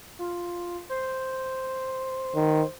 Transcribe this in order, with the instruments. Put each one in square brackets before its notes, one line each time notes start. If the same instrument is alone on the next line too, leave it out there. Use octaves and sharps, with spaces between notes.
[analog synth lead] F4
C5
[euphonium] D#3